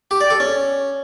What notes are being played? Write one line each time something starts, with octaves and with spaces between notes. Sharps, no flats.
G4
D5
A4
C#4